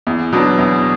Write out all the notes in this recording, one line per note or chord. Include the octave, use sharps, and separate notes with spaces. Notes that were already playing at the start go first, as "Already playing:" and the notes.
E2
B2 F#3 B3 D4
E2